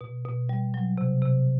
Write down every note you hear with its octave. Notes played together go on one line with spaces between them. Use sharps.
B2
B2
G3
F#3
C3
C3